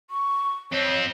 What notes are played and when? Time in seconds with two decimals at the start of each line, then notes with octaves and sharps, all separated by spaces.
0.10 C#6
0.72 F2 C4 C#5